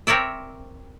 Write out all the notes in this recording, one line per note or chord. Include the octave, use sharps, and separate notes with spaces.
C4 A#4 C#5 D5 E5